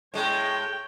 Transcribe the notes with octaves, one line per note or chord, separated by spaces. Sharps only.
A2 G#3 C#5 G5